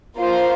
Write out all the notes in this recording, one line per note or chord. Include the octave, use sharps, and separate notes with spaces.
A#3 F4 C5